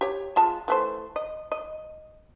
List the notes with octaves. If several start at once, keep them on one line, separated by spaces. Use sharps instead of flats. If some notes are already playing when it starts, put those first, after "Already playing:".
G4 C#5
G#3 F4 A5
E3 A3 C5
D#5
D#5